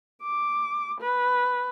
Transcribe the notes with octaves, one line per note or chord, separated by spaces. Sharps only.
D6
B4